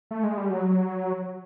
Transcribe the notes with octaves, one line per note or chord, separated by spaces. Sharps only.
A3
G#3
G3
F#3